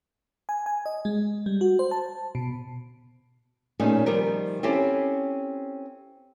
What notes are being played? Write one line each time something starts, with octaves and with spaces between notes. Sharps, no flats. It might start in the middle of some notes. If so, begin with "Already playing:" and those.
G#5
G#5
D#5
G#3
G3
F#4
C5
A5
B2
A#2 A3 A#3 C#4 D#4 G#4
D#3 F3 G3 A#4
C4 C#4 E4 G4 A4